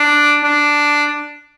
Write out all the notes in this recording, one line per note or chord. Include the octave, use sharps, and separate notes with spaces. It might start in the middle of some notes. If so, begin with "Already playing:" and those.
Already playing: D4
D4